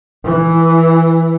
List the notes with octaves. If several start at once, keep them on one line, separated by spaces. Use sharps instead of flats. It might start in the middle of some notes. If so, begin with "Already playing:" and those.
E3